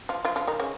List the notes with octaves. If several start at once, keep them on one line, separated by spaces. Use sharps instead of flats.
F3 F4
F3 F4
F3 F4
D#3 D#4
C#3 C#4